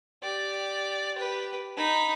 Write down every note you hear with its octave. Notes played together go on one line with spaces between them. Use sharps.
G4 D5
G4 B4
D#4 B5